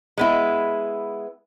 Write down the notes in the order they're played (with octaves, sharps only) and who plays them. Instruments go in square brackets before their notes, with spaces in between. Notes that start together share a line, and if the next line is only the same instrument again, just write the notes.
[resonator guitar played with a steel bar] G#3 B3 E4